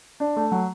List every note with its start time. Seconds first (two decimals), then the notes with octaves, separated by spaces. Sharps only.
0.20 D4
0.36 A3
0.52 F#3